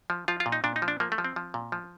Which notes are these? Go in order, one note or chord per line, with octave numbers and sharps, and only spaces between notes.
F3
F3 F4
F4
A#2
D#4
A#2 D4
D#4
F3
D4
F3 A#3
A3
F3
C4
F3
A#2
F3